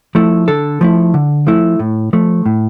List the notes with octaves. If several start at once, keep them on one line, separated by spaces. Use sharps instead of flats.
F3 A3 E4
D3 A4
F3 A3 E4
D3
F3 A3 E4
A2
F3 A3
A2